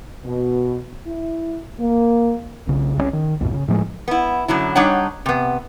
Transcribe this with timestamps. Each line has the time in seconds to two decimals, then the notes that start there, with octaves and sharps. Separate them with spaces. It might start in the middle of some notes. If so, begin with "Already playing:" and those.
0.25 B2
1.06 E4
1.79 A#3
2.67 B1 C#3
2.97 C2 E3 C#4
3.13 D#3
3.40 B1 F2 G#2 B2
3.53 C#3
3.68 A2 F3 G3 G#3
4.08 B3 E4
4.48 F#2 D3 F#3 E4
4.76 G3 D4 D#4 C#5 F#5
5.26 C3 B3